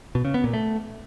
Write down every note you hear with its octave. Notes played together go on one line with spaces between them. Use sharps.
B2
C#3
B3
A#2
A3